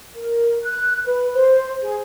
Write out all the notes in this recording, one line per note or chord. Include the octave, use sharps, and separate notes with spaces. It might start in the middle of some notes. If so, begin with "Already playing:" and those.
A#4
F#6
B4
C5
G#4